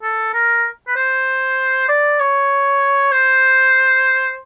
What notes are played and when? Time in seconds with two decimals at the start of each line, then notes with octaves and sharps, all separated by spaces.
0.03 A4
0.33 A#4
0.87 B4
0.96 C5
1.89 D5
2.20 C#5
3.12 C5